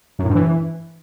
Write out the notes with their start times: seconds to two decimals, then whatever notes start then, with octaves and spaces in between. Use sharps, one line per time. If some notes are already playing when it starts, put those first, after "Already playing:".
0.19 F#2
0.24 A2
0.30 G2
0.35 E3